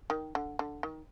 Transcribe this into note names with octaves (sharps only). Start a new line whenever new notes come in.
D#3
D3
D3
D#3